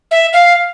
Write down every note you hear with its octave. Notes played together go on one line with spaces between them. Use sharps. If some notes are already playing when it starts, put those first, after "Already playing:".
E5
F5